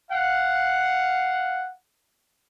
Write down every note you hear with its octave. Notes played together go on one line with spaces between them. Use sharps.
F5 F#5